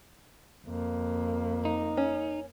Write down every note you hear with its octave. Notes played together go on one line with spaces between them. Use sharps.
F2 A#3
D#4
C#4